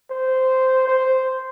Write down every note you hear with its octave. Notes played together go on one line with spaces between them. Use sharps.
C5
C5